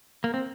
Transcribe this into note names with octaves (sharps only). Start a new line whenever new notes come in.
A#3
C4